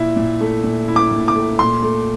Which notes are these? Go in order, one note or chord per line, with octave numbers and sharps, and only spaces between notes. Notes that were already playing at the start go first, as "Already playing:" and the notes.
Already playing: A#2 E4 E5
A#2
A3
A#2
E4
D6
A#2
D6
A3
A#2 C6
A3